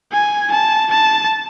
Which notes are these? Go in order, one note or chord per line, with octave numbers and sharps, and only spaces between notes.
G#5
A5
A5